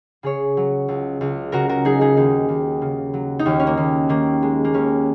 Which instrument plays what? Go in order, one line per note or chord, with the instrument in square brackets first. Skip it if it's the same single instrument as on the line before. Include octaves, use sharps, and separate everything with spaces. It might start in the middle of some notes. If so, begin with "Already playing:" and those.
[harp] C#3 G#4 C#5
F#3
C#2
C#2
C#3 F#4 A#4
F#4 A#4
F#3 D#4 G#4
D#4 G#4
D#2 A#3 D#4
D#2
C#3
F#3
D#4
D#2 C#4
C#4
A#3
D#2
D#3 A#3
G#3
A#3
D#2 C#4